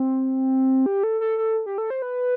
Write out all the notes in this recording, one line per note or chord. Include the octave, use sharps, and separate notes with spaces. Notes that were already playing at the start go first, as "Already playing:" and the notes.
Already playing: C4
G4
A4
A4
A4
G4
A4
C5
B4